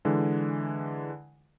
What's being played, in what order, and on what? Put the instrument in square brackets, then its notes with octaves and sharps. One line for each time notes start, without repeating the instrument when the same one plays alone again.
[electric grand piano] D3 E3 G#3